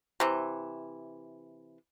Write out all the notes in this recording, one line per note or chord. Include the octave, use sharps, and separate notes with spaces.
C3 E3